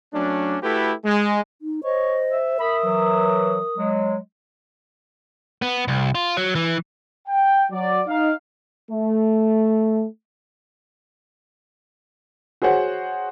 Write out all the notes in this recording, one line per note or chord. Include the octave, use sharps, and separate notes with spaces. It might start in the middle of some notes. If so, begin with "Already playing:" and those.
F#3 A3 C#4 D4
A3 E4 F#4 G4 A4 B4
G#3
D#4
C5 C#5 D#5
E5
A#4 B5 D#6
E3 F#3
F#3 G#3
B3
C2
F4
F#3
E3
G5
F#3 D5
D#4 F5
A3
F#4 G#4 C5 C#5 F#5